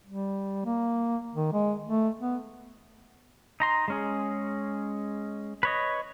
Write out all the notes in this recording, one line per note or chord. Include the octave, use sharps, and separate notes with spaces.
G3
A#3
D#3
G#3
A3
B3
D#4 A#5 C6
G#3 C#4 G#4
B4 C#5 D#5